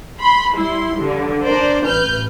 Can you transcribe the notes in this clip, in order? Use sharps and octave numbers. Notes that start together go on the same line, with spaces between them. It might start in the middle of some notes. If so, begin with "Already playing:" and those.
B5 C6
G3 E4 C6
G2 D3
D4 A#4 C5 D5
A1 B4 F6 G6